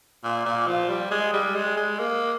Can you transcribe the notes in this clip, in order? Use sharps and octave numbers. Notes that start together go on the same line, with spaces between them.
A#2
A#2
F3
G3
G#3
G3
G#3
G#3
A#3